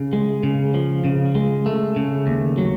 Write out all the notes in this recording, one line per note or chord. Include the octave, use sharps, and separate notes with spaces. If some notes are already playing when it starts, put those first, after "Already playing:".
Already playing: C#3
G#3
C#3
F3
C#3
G#3
A3
C#3
D#2
F#3